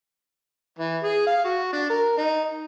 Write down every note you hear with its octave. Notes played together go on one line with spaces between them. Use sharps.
E3
G#4
F5
F#4
D4
A#4
D#4